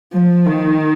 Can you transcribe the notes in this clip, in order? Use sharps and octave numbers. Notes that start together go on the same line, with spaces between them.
F3
D#3